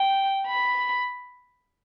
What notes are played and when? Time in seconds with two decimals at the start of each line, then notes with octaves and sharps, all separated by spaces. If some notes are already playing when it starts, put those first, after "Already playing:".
Already playing: G5
0.47 B5